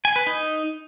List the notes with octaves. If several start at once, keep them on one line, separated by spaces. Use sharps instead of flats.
G#5
B4
D#4